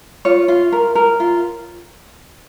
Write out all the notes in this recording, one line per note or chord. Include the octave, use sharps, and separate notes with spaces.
F4 C#5
F4
A#4
A#4
F4